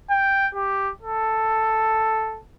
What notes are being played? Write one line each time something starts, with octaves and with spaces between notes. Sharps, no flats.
G5
G4
A4